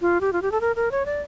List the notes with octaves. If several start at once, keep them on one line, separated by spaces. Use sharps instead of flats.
F4
G4
F4
G4
A4
A#4
A#4
C#5
D5